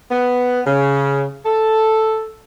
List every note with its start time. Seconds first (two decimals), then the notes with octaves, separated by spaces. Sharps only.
0.11 B3
0.67 C#3
1.46 A4